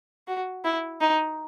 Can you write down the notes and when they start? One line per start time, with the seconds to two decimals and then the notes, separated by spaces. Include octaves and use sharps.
0.28 F#4
0.64 E4
1.01 D#4